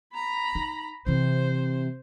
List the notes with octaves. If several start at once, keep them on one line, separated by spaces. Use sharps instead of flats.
A#5 B5
D#4
C3 E3 E4 C5